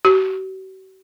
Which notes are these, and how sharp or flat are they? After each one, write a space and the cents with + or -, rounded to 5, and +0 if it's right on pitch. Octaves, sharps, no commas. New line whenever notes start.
F#4 +45